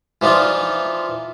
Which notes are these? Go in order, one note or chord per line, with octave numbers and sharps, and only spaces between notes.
E3 F3 D4 D#4 F4